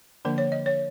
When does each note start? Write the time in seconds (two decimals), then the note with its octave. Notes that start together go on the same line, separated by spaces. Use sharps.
0.25 D3 F3 A#3 D4 C5
0.38 C#5
0.52 D#5
0.66 C#5